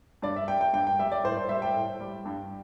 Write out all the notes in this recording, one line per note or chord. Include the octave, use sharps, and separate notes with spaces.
G2 D5
E5
G3 G5
G5
G2 G5
G5
G3 E5
D5
A2 C5
C5
G3 E5
G5
A2
G3
G2